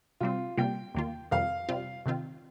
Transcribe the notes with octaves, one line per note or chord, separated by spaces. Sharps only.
C3 G3 C4 F4
C3 G3 A#3 F4 G5
D#2 D#3 A#3 F4
F2 C3 D#3 G3 F5
C3 G3 C4 F4
C3 D#3 C4 F4